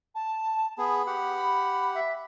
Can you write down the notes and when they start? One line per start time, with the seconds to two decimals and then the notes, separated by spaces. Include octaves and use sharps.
0.15 A5
0.78 B3 G#4 B5
1.07 G4 F#5
1.95 E5